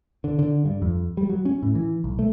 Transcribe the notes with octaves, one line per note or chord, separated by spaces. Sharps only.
D3
D3
G2
F2
G3
F#3
C#4
A2
E3
B1
A3